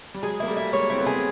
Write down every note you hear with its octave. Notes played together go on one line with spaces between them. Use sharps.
G3
F#3 G#3 G#4
A#3 E4
G3 A3
E4
G#3 A#3 C#5
C4 E4
A3 B3
G#4